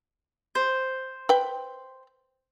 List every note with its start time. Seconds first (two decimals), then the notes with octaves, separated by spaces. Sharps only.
0.55 C5
1.29 B4 G5